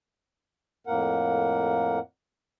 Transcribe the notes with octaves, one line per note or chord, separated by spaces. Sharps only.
F2 A2 A#3 A#4 F#5